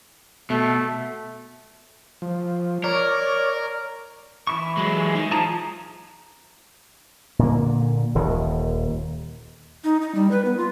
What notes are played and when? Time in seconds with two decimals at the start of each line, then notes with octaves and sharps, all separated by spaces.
0.50 B2 A3
2.22 F3
2.84 A#4 C#5 D5
4.47 E3 E4 C#6
4.77 F#3 G#3
5.15 D#3
5.31 F3 G#4 A5 A#5
7.39 A#2 D3 A#3
8.15 D#1 D#2 D#3
9.84 D#4
10.02 D#4
10.15 G3
10.31 B4
10.45 B3
10.57 F4